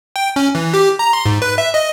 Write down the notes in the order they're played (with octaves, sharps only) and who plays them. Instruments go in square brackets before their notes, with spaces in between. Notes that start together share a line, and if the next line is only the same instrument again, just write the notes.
[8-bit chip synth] G5
C#4
E3
G4
A#5
C6
G#2
B4
E5
D#5